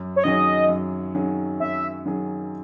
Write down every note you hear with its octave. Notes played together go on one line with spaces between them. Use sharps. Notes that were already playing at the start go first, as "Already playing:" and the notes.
Already playing: F#2
C#5
D#3 F#3 C#4 G#4 D#5
F#2
D#3 F#3 C#4 G#4
F#2 E5
D#3 F#3 C#4 G#4